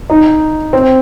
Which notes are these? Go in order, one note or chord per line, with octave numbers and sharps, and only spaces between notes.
D#4
C4